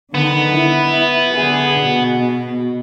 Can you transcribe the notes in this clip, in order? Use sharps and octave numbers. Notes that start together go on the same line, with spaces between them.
D3 D#3 B3
E4
D3 G#4
B2